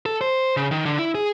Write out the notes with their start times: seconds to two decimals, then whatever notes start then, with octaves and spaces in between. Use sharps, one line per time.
0.06 A4
0.21 C5
0.57 C#3
0.71 D#3
0.85 D3
0.99 E4
1.15 G#4